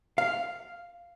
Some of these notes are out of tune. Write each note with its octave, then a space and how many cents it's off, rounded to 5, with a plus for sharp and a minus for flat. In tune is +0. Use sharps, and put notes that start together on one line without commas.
F5 -5